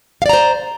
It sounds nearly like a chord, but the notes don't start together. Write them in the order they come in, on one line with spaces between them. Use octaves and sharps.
F5 D5 A#5 C5